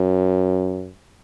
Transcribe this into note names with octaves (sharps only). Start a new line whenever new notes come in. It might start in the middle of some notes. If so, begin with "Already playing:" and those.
Already playing: F#2